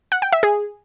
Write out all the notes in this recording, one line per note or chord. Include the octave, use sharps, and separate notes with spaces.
F#5
G5
E5
G#4